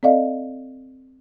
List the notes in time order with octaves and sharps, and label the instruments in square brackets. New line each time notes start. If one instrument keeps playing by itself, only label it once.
[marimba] C4 A4 D5 D#5 F5